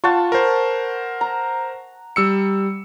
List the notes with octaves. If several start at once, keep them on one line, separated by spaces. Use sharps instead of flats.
F4 F#5 A5 C#6
A#4 C5
A#5
G3 E6 C#7